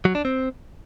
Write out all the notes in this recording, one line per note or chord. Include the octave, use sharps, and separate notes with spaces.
F#3
D4
C4